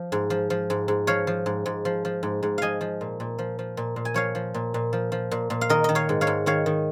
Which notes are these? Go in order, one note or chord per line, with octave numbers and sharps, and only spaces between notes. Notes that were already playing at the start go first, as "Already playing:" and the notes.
Already playing: F3
G#2
F3
F3
G#2
G#2
F3 C#5 F5
F3
G#2
G#2
F3
F3
G#2
G#2
F3 D#5 F5 G#5
F3
A#2
A#2
F3
F3
A#2
A#2
G#5
F3 C#5 F5
F3
A#2
A#2
F3
F3
A#2
A#2
F5
D#3 A#4 D#5
D#3 D#5
C#5 F5
G#2
C#5 F5
G#2
D#3 C#5 F5
D#3